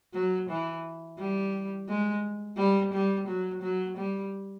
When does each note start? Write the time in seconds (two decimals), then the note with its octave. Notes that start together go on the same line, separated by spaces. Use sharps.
0.13 F#3
0.49 E3
1.18 G3
1.88 G#3
2.57 G3
2.93 G3
3.27 F#3
3.62 F#3
3.97 G3